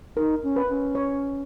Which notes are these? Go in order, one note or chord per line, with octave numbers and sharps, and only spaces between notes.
D#4 A#4
C#4
B4
C#4
C#5